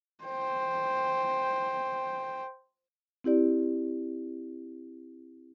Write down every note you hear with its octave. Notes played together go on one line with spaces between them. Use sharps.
C5 G5
C4 E4 G4 D5